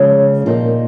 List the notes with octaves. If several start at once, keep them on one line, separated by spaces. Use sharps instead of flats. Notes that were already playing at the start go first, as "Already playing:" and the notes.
Already playing: C#3 F3 G#3 C#4
A#2 F3 A#3 D#4